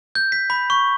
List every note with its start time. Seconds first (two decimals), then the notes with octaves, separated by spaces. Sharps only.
0.15 G6
0.32 B6
0.50 B5
0.70 C#6